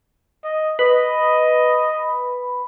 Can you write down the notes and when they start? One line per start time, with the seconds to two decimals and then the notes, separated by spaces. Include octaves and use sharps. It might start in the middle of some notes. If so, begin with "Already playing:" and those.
0.44 D#5
0.79 B4 D#5 B5